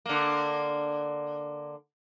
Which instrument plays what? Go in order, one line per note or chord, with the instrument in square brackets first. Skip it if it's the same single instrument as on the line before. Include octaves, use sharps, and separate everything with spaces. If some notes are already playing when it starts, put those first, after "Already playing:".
[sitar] D3 A#3